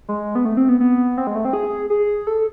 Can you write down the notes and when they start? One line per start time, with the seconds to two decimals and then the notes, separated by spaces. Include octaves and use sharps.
0.09 G#3
0.35 B3
0.45 A3
0.57 C4
0.69 B3
0.80 B3
1.18 C4
1.27 G#3
1.35 A3
1.45 C4
1.53 G#4
1.90 G#4
2.27 A4